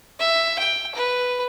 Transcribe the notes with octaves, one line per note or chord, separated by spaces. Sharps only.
E5
G5
B4